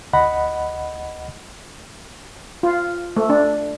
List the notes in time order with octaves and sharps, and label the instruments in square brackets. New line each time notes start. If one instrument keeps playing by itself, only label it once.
[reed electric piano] D2 D#5 F#5 B5
[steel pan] F4
A3
D4